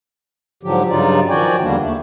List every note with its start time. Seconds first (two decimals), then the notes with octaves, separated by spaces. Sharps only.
0.63 G#2 D3 F3 F#3 G4
0.89 G2 C#3 F#3 D#4 F4 D5
1.29 D#3 F3 F#4 D5 G5 G#5
1.61 E2 D3 G3 A#3 D4
1.80 D#2 A3